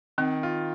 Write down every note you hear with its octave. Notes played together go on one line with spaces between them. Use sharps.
D#3 C4
F4